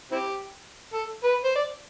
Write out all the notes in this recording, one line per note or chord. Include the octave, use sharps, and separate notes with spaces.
C4 E4 G4
A4
B4
C5
D5